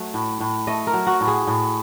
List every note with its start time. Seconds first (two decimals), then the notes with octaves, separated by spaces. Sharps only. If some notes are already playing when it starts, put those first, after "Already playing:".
Already playing: F#3 A3
0.14 A2
0.40 A2
0.67 A3 D#5
0.87 A#4
0.93 F#3
1.07 F#4
1.21 A2
1.27 G#4
1.47 A2